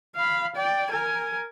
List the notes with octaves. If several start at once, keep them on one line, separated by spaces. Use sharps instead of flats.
F5 B5
D5 G5
A#4 G#5